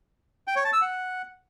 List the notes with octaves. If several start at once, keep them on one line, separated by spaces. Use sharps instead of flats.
G5
C#5
A5
E6
F#5